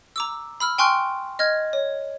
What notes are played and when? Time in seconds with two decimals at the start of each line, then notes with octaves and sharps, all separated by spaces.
0.16 A#5 D6 E6
0.60 B5 E6 F6
0.78 G5 G#5 C6 C#6 F6 F#6
1.39 D#5 F6 G#6
1.73 C#5